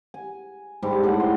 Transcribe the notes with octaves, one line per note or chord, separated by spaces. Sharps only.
G#5
G#2 G3 D4 D6
A2 D4 F#5
D4 C6